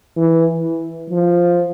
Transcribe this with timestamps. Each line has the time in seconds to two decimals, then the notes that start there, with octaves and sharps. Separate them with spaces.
0.17 E3
1.10 F3